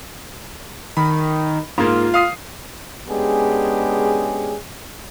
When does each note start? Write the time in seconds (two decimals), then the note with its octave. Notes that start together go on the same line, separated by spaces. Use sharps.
0.97 D#3 B5
1.78 G#2 A#3 F4
2.14 F5 D#6 C7
3.08 G#3 B3 C#4 D4 G4 G#4